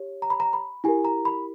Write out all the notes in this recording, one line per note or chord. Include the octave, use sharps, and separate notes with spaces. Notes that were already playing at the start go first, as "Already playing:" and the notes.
Already playing: G4 C#5
A#5
B5
A#5
B5
E4 G4 A#4 G#5
A#5
B5